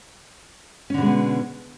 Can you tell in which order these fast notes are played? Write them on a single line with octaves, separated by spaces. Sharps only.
C#4 D3 B2 G#3 B3